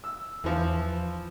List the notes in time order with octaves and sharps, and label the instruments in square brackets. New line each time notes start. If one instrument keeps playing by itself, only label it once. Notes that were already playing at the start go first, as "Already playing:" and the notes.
[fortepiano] E6
[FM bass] E2 [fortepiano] E3 F3